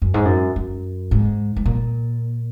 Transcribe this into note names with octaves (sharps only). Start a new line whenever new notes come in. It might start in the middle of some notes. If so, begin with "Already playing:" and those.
F#2
G#2
F#2
F#2
G#2
G#2
A#2